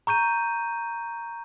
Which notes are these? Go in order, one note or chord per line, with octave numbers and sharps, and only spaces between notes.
A#5 C#6 G6 D#7